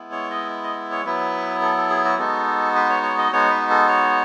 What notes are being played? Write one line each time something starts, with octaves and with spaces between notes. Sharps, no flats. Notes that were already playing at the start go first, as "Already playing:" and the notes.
Already playing: G#3 B3 E4
C#5
D#5
D#5
C#5
F#3 B3 E4 B4
A4
A4
G#4
F#4
G#3 B3 D#4 F#4 A4
B4
C#5
C#5
D#5
G#3 B3 D#4 F#4 C#5
B4
A4
C#5